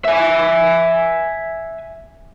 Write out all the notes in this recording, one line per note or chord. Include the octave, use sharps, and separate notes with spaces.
E5 G#5